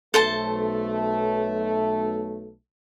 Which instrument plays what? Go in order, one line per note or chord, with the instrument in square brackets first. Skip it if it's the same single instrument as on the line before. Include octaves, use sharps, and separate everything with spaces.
[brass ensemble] B1 A3 [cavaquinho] A4 C5 A5